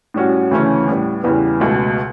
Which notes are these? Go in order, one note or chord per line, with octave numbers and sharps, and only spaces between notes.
A2 G3 C#4 F#4
D2 C#3 E3 A3 C#4
A2 G3 B3
E2 C#3 E3 G3 B3
C#2 B2 A3